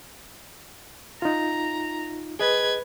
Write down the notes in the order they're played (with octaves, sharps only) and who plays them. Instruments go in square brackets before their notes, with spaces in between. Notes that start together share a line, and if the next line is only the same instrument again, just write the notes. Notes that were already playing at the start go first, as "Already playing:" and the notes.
[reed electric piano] D#4 F4 [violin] A#5
[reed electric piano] G#4 D#5 [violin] B4 G#6